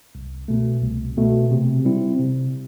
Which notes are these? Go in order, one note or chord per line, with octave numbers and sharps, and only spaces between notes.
C2
B2 A3
C2
B2 A3
C3
G3 C4 E4
C3